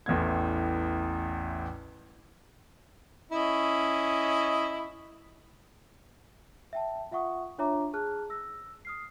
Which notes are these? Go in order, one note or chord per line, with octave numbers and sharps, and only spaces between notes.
A1 E2 A2 G#6
C#4 E4 D#5
E5 G5 A5
F4 E5 F#5 C#6 D#6
D4 F4 C#5 E5 A#5 D6
G#4 A5 F6 F#6
E6 A#6
D#6 F6 C7